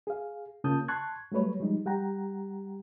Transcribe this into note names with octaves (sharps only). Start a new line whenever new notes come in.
G#4 F5
C#3 A#3 F4 A5 D#6 G6
A5 C6 C#6 F#6 G#6
F#3 G3 A3 B4 C#5
F3 G3 G#3 D#4
G3 G4 F#5 G5 A#5